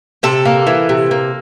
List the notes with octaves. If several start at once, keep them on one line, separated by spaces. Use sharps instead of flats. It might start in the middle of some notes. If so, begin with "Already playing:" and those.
C3 A4
A#3
E3
C3
A#3